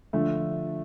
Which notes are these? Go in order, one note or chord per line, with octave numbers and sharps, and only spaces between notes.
D3 F3 A3